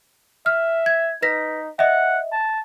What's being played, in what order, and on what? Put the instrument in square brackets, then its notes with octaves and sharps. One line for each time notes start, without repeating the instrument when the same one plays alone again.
[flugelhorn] E5 [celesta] F6
[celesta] G#6
[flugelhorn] D#4 [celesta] B4 A#6 B6
[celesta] D#5 E5 [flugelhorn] F#5
[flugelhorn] A5